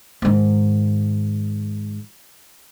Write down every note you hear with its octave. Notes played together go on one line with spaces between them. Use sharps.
G#2 D#3